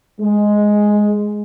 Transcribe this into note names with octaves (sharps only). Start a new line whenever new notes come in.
G#3